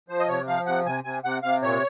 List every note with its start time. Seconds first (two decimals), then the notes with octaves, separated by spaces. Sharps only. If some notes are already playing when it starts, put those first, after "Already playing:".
0.09 F3 C5
0.20 D#5
0.28 C3 C#5
0.47 F3 F5
0.66 C3 F#5
0.86 C3 G#5
1.04 C3 G#5
1.24 C3 F#5
1.43 C3 F5
1.62 A#2 C#5